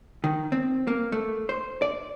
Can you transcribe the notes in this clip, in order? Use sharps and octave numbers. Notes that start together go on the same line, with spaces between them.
D#3
C4
A#3
A3
C5
D5